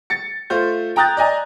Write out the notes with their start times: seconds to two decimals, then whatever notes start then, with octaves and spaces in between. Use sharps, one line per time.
0.10 A6 C#7
0.50 A3 F4 C5 G6
0.96 G5 A#5 D#6 F#6 G6 A6
1.17 D5 D#5 G#5 A#5